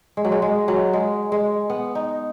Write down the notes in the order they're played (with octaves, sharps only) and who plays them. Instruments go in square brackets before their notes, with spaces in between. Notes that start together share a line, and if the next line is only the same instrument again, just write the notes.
[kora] G#3
F#3
G#3
G#3
F#3
G#3
G#3
B3
D#4